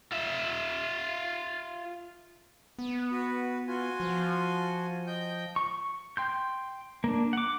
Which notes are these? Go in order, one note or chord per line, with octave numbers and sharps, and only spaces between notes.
F4 E5
B3
F#4 B4
F4 F#4 G#5
F3
D#5 G5 G6
C#6
G5 C6 G6
A#3 D4
F#5 D6